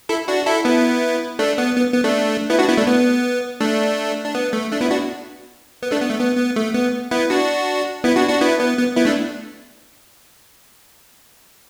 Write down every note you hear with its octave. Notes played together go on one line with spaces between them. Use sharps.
E4 A4
D4 F#4
E4 A4
B3 E4
A3 D4
B3
B3
B3
A3 D4
B3 E4
D4 F#4
B3 E4
A3 D4
B3
A3 D4
D4
B3
A3
A3 D4
B3 E4
D4 F#4
B3
A3 D4
B3
A3
B3
B3
A3
B3
B3 E4
D4 F#4
B3 E4
D4 F#4
D4 F#4
B3 E4
B3
B3
B3 E4
A3 D4